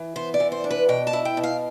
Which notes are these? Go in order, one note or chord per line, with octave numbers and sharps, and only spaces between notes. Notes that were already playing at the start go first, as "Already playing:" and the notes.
Already playing: E3
B3 C5
D5
E3
C5
D4
B4
B2 G5
A5
E4
G5
B2
F5